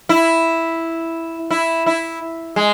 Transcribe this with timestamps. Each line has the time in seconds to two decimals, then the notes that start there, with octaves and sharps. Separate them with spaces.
0.09 E4
1.51 E4
1.86 E4
2.56 G#3